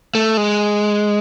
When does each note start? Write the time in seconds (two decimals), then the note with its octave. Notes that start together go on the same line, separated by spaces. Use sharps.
0.15 A3
0.37 G#3